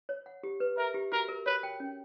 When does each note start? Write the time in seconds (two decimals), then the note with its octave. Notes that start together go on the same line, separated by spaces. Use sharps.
0.09 C#5
0.26 F#5
0.43 G4
0.60 B4
0.77 A#4 E5
0.94 G4
1.12 F#4 A#4
1.29 A#4
1.46 B4 C#5
1.63 G5
1.80 C#4